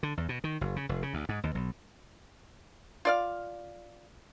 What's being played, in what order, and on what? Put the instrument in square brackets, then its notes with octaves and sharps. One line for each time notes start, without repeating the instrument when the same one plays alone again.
[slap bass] D3
E2
B2
D#3
F#1
C#3
F1
C#3
D2
G#2
D#2
B1
[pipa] F4 D5 F5